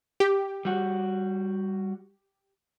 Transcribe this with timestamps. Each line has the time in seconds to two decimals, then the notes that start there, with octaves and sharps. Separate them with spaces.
0.20 G4
0.65 G3 F#4